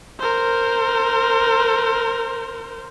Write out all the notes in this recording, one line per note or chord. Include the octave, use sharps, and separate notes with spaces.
A#4 C5